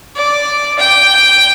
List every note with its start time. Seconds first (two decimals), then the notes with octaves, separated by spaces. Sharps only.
0.16 D5
0.79 G5